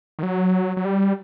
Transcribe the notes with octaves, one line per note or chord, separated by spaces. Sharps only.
D#3
F#3
F#3
G3